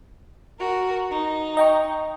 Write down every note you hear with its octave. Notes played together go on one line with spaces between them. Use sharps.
F#4 A#4
D#4
D#5 G5 C#6